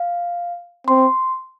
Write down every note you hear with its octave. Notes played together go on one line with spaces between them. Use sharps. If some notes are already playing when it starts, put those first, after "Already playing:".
Already playing: F5
C4 C6